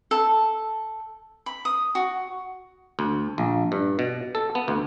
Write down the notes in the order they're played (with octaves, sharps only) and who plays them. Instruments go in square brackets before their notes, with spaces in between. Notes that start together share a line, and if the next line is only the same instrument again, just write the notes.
[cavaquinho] A4
B5
D#6
F#4
[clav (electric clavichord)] D2
A#1
G2
B2
A4
B3
D2